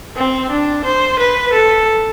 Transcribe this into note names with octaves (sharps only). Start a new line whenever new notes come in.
C4
D4
C5
B4
A4